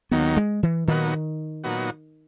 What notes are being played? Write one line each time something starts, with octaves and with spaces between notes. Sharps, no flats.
D#2 D#3 F#3 B3
G#3
E3
A#2 D#3 F#3 B3 D#4 F#4
A#2 F#3 B3 D#4 F#4